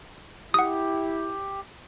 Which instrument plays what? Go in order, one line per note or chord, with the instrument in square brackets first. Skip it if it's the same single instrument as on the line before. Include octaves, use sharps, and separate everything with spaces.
[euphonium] E4 [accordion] G4 [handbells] F#5 D#6